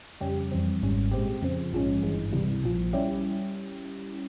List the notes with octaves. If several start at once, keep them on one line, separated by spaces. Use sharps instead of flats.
F2 C#3 G3 C#4 G4
F2 E3 G3 C4
G#1 G#2 G3 C#4
A#2 G#3 C4 G4
F2 C#3 F3 C4
A#1 G#2 F3 G#3 C#4
G#1 G2 E3 G#3
C#2 C3 E3 G3
A#1 A#2 F3
G3 C#4 E4 G4